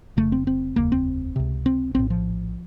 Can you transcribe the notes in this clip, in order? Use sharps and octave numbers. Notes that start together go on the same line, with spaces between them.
F1 F2 C#3 A3
C4
C4
F1 D#2 C#3 A#3
C4
C#2 C3
C4
A#1 A2 C4
F3